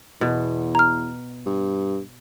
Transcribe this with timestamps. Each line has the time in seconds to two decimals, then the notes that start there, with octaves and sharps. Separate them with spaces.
0.21 E2 B2
0.75 A#5 F6
1.46 G2